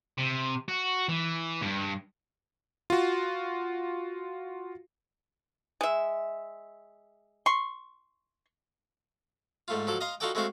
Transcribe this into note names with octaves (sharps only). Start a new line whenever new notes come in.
C3
F#4
E3
G2
F4 F#4
G#3 E5
C6 C#6
G#2 A3 F4
F3 F#3 A4 D5
D#5 F5 A#5 C6
D#4 F4 F#4 A4 D5 G5
G#3 A3 C4 F#4 C5 F5